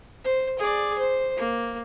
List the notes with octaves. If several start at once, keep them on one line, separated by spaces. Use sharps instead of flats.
C5
G#4 D5
C5
A#3